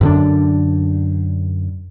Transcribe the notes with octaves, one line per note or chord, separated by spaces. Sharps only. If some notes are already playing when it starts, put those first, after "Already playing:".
F#2 D3 D4